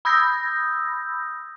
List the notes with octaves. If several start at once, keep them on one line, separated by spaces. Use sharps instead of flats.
B5 D#6 E6 G6 G#6 A#6